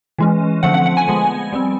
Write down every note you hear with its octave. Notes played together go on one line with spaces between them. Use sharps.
E3 G#3 C#4
D3 F3 A3 C4 F#5
F#5
F#5
G#5
F3 G#3 B3
G3 C4